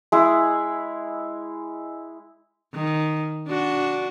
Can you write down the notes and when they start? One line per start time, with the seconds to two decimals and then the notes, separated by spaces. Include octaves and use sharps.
0.12 G#3 E4
2.74 D#3
3.48 D4 F#4